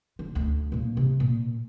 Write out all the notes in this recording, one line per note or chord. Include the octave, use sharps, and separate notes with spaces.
D3
D2
A#2 A#3
C3
A#2